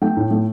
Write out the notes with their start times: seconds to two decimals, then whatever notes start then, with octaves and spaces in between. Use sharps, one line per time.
0.02 A3 G5
0.17 A2
0.31 A3